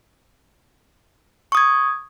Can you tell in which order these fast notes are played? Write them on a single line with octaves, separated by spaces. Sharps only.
C#6 D#6 G#6